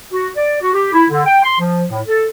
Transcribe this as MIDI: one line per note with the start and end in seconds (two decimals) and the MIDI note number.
0.12 0.28 66
0.36 0.55 74
0.61 0.71 66
0.73 0.88 67
0.93 1.05 64
1.10 1.25 50
1.25 1.43 79
1.43 1.58 84
1.59 1.84 53
1.90 2.01 45
2.06 2.27 69